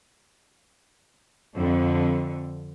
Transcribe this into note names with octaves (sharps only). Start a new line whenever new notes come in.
F2 D3